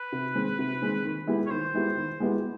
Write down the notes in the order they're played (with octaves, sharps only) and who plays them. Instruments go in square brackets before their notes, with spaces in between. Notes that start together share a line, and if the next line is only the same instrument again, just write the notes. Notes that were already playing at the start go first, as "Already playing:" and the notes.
Already playing: [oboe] B4
[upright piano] C3
D#3 G#3 C4
C3
D#3 G#3 C4
D#3
G#3 B3 E4 G4
[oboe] C#5
[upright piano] D#3 [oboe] C5
[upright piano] G#3 B3 E4 G4
D#3
G#3 B3 E4 G4